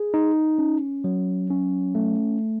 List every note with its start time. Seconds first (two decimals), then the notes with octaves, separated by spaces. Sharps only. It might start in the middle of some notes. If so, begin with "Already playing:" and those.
Already playing: G#4
0.14 D#4
0.58 C#4
1.04 F#3
1.50 C#4
1.95 A3